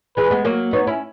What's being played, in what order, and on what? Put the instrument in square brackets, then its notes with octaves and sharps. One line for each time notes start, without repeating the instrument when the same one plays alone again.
[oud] E3 G#3 [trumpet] B4
[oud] G#3 B3
F#3 A#3
[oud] B3 D#4 [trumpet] C#5
[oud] C#4 E4